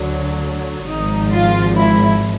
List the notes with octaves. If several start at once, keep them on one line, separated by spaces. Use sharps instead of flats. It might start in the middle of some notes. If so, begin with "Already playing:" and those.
Already playing: D2 D3 F#3
G#1 G#2 F3 D#4
F4
E4